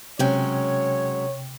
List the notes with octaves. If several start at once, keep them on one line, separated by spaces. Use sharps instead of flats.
C3 F#3 G#3 C#4 C#5 G5